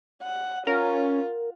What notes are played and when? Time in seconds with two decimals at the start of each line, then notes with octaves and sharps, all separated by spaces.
0.23 F#5
0.67 C#4 F4 A#4